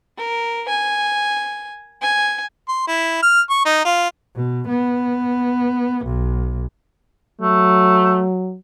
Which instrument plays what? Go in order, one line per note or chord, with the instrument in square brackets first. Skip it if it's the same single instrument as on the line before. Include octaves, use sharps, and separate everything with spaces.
[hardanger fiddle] A#4
G#5
G#5
[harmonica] C6
E4
F6
C#6
D#4
F4
[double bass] B2
B3
B1
[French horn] F#3 [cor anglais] A3